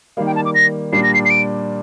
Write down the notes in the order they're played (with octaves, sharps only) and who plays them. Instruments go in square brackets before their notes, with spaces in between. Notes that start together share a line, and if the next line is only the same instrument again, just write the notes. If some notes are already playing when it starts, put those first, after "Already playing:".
[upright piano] D#3 G3 A#3 [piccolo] F5
[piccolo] G5
A5
D6
A#6
[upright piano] A#2 G3 A#3 D4 [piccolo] C7
[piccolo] A#6
C7
C7
D7